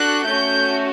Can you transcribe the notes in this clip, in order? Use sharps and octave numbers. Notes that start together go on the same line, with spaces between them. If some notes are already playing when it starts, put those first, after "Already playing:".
Already playing: D4 F#4 A4 F#6
A3 C#4 F#4 G6